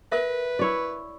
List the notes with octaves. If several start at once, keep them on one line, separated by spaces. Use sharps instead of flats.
A#4 B4 E5
E4 C#5 D5